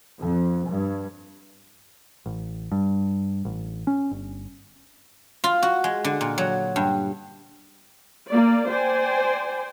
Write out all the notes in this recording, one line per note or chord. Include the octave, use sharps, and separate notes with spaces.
F2
G2
A1
G2
A1
C#4
G1
F4
F#4
G#3
D3
A#2
F#3
G2
A#3 D5
C5 D5 G5 G#5 C6